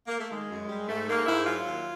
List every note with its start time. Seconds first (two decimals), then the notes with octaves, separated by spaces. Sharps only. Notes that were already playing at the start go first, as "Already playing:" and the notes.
0.07 A#3
0.19 A3
0.31 D#3 G#3
0.50 F#2
0.69 G3
0.88 G#2 A3
1.08 G#2 A#3
1.27 G#2 E4
1.46 F#3 F4
1.66 D#2